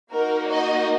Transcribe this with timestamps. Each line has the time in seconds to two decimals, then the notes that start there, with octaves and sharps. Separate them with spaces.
0.12 A#3 D#4 F#4 A#4
0.50 D#5